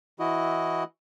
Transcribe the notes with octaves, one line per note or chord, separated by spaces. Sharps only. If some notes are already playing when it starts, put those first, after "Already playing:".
E3 E4 F#4 D#5